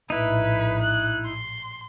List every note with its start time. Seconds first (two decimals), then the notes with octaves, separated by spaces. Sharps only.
0.10 A#1 A2 D#4 E4 B4
0.82 F#6
1.25 C6